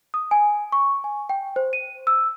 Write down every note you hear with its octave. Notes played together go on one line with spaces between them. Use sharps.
D#6
G#5
C#6
G#5
G5
C5
D#7
E6